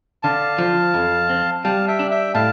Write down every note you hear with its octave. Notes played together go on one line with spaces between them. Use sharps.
D3 F5 A5
F3
F2
C4
G3 F5 A5
E5 G5
D4
E5 G5
A2 F5 A5